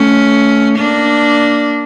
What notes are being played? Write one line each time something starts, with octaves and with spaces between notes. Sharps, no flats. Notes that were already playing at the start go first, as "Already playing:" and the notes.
Already playing: A3 C#4
A#3 D4